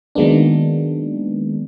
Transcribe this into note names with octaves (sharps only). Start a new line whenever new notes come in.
D#3 F#3 G#3 A#3 B3 D4